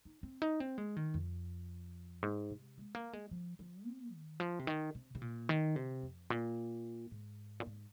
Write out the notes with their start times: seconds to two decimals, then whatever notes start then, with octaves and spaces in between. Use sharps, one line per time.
0.05 D#4
0.23 C4
0.42 D#4
0.60 C4
0.78 G#3
0.96 D#3
1.14 F2
2.23 G#2
2.50 C3
2.78 G#3
2.95 A#3
3.13 G#3
3.31 F3
3.59 F3
3.86 C4
4.13 D#3
4.40 F3
4.59 C3
4.67 D#3
4.95 C3
5.15 C3
5.22 A#2
5.49 D#3
5.76 C3
6.03 F2
6.30 A#2
7.11 G#2
7.60 A#2
7.66 G#2